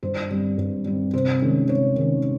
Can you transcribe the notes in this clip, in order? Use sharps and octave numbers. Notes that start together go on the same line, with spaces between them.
G2 C5
G3 C4
G2
G3 C4
C3 C5
D#3 G#3 C#4
C3 C#5
D#3 G#3 C#4